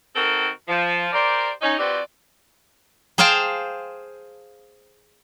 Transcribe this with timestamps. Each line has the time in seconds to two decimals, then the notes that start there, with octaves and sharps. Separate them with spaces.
0.16 D#3 C4 F#4 A4 A#4
0.68 F3
1.13 G4 A#4 C5 D5
1.62 C#4 D#4
1.79 F3 C4 F#4 G4 B4 D5
3.18 G#4 C5 F5 G5 A5